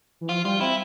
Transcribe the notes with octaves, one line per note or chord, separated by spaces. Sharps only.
E3
F3 F4
G3 F4
C4 E4